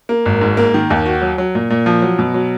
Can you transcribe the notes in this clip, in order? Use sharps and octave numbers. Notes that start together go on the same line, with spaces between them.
A#3
G#1
G#2
A#3
D#3
D#2
F#4
F#3
F#3
A#2
A#2
F3
F#3
B2
F#3